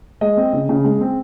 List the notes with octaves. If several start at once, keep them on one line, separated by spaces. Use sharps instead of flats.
G#3 D#5
C4
C#3
C#3
G#3
C4